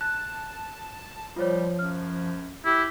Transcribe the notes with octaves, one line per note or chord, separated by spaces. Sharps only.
A5 F#6
F3 G3 F4 C5 C#5
F#2 F6
E4 G4